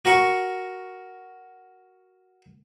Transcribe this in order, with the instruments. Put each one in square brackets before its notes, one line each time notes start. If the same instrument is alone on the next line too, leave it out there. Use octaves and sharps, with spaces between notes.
[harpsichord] F#4 A#4 F#5 C#6